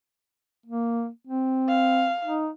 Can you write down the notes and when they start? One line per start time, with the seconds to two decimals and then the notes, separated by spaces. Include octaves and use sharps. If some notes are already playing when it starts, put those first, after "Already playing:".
0.66 A#3
1.27 C4
1.68 F5
2.25 D#4